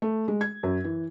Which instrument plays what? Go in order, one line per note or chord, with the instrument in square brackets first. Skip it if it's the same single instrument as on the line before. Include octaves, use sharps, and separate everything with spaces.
[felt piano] A3
G#3
G#6
F#2
E3